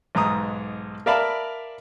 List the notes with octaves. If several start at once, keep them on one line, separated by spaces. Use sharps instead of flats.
B1 G#2 A#5 D#6
A#4 D5 E5 F5 A5 B5